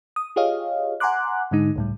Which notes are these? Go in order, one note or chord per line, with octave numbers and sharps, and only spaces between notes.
D#6
F4 G4 G#4 C#5 D#5 F5
F#5 G#5 A#5 C6 D6 F#6
G#2 D3 G#3 D#4
C#2 A2 G3